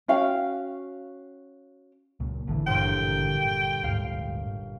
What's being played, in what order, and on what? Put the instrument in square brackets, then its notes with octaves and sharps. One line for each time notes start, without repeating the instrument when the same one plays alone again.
[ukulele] C#4 F#4 F5 G5
[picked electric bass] C#2 A#2
G#1 D3 E3
[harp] G1 A#2 [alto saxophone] G5
[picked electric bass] D2 G#2 [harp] F5